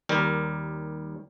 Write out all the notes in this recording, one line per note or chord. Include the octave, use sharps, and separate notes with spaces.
D#2 G3 A#4